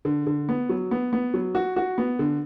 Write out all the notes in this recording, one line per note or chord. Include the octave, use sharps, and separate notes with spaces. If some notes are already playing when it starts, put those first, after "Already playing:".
D3
D3
B3
F#3
B3
B3
F#3
F#4
F#4
B3
D3